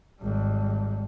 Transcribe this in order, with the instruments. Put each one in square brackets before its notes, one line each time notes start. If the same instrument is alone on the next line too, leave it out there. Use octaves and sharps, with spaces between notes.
[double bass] G#1 G3